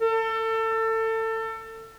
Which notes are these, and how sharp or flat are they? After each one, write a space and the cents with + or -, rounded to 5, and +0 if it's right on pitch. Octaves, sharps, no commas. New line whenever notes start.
A4 +30